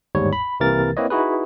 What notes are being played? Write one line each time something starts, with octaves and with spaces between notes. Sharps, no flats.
G1 D#2 G#2 G3 C#5
B5
C2 C3 E3 A#3 A#4 A6
A#3 C4 E4 B4 C#5 D#5
D#4 E4 F#4 G#4 B4